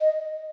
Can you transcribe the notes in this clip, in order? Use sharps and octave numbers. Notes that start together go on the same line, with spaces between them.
D#5